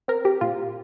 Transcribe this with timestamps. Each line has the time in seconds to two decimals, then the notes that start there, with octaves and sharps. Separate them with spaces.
0.08 C4 A#4
0.25 G4
0.41 A#2 F4